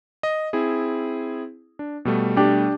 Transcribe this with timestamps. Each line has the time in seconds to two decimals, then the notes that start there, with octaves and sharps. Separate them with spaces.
0.23 D#5
0.53 C4 E4 G#4
1.79 D4
2.05 B2 G3 A3
2.37 D4 G4